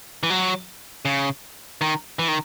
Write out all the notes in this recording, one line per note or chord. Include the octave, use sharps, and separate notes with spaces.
E3
F#3
C#3
D#3
E3
D#3